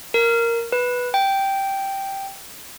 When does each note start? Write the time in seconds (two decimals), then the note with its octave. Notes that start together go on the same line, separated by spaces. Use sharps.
0.14 A#4
0.72 B4
1.14 G5